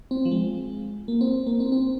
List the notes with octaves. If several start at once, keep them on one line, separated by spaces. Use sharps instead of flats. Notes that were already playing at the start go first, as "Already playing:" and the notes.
C4
F3
G#3
A#3
C4
A#3
C4
C4